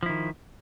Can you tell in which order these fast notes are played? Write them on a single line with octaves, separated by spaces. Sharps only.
F3 E4 D#3